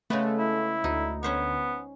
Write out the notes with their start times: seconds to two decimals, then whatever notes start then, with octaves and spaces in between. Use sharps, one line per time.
0.10 C#3 G#3 A3 B3
0.38 E4
0.84 D2 D#4
1.23 B3 C#4 C5 C#5